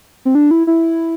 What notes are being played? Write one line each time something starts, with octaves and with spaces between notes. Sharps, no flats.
C4
D4
E4
E4